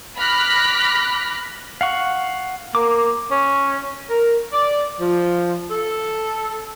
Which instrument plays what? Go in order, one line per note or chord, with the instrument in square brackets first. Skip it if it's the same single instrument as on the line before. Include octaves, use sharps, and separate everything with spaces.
[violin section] B5 D6 F6 F#6 A#6 B6
[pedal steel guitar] F5 F#5 C#6
[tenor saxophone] A#3 [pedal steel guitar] D6
[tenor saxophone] C#4
[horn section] A#4
D5
F3
A4